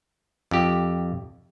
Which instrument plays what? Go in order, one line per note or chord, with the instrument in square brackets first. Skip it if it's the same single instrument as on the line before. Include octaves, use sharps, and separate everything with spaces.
[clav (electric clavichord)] F2 G4